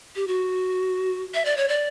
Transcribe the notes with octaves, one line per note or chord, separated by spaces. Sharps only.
G4
F#4
E5
D5
C#5
D5